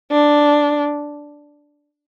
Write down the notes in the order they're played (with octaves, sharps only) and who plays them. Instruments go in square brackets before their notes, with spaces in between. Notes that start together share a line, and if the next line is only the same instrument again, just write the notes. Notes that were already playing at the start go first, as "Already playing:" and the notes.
[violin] D4